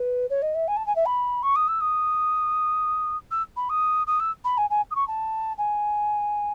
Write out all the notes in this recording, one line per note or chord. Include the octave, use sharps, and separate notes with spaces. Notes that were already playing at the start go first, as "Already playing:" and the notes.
Already playing: B4
C#5
D#5
E5
G#5
A5
G#5
E5
B5
C#6
D#6
E6
D#6
E6
B5
D#6
D#6
E6
B5
G#5
G#5
D#6
C#6
A5
G#5